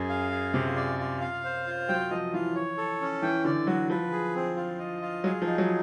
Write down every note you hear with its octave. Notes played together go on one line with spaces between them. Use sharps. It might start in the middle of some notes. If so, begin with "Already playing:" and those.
Already playing: F#2 G#4
F5
G#4
C3 F4
D5
F4
F5
C5
F4
F#3 G5
F3 D#5
E3 F4
C#5
A4
C#4
E3 G5
D3 D5
F#3 F#4
F3 B4
G#4
C4
F4
D#5
F4
F#3 G#4
F3
D#4
F#3